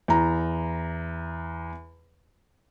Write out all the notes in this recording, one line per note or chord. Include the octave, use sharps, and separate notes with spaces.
E2 A#5